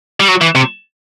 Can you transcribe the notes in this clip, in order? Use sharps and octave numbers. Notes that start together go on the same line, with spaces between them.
G3
F#3
E3
C3